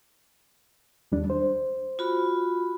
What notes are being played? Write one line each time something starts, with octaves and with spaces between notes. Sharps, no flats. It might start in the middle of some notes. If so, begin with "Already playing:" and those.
D#2 G3 D4
C5
F4 F#4 B5